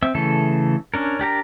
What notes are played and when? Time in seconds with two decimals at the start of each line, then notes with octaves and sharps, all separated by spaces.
0.03 C4 E5 E6
0.15 C#3 E3 A3 A4
0.94 C#4 D4 A#4
1.19 D4 G4 A#4 A#5